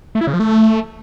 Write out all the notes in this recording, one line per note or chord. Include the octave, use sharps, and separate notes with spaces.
A3
E4
C#3
F3
A3